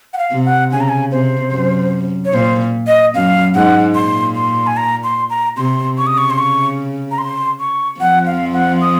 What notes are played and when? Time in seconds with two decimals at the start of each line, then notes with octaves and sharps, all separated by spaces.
0.14 F#5
0.18 F5
0.31 C3
0.46 F#5
0.71 C#3 G#5
0.81 A#5
0.89 G#5
1.12 C3 C5
1.52 F#2
2.25 C#5
2.33 A#2 C5
2.87 D#5
3.15 F#2 F5
3.54 G#2 F#5
3.95 A#2 C6
4.35 C6
4.67 G#5
4.77 A#5
5.04 C6
5.30 A#5
5.57 C3 C6
5.98 C#3 C#6
6.07 D#6
6.18 C#6
6.30 C6
6.38 C#6
7.11 A#5
7.18 C6
7.60 C#6
8.00 F2 F3 F#5
8.26 F5
8.54 F#5
8.81 D#6